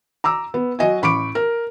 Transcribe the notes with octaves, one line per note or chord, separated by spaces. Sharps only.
A#5 D6 E6
B3
F#3 F#4 D#5 G#5
A1 B5 C#6 D6 D7
A#4